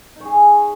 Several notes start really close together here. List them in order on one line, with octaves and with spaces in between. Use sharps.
D#4 C#5 G#4